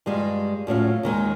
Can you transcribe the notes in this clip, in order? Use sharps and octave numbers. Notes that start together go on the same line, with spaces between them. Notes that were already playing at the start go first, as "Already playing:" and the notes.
G2 G3 G#3 F4
F#2 A2 C#4 F4
D#2 D#3 G#3 C#5